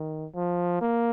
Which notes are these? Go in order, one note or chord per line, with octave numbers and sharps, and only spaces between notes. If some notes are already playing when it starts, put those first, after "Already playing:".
Already playing: D#3
F3
A#3